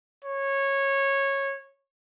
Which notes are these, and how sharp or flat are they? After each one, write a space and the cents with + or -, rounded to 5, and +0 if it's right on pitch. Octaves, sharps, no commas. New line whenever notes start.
C#5 -15